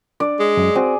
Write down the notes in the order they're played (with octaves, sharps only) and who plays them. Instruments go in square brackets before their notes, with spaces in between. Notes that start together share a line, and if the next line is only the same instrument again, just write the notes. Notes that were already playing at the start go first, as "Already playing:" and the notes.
[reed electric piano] D4 [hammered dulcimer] D5
[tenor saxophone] G#3
[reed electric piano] F#2
[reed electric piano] C4 F#4 C5 [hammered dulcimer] G#4